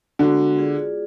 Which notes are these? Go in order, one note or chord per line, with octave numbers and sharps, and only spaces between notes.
D3 G#3 B3 F#4
F4 G#4 D5